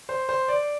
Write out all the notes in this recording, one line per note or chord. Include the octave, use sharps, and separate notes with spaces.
C5
C5
D5